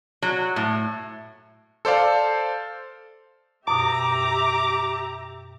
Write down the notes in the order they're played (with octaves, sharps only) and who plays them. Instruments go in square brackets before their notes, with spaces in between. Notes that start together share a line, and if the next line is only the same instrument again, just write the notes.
[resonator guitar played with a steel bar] F#3
A2
[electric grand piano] A4 C5 D5 F5
[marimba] F#2 B2 [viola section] G4 E5 A#5 [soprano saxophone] D6